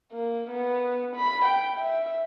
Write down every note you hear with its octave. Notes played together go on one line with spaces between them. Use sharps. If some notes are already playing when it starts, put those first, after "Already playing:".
A#3
B3
B5
G5
E5